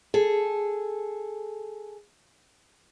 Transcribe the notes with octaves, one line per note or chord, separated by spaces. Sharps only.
G#4 A4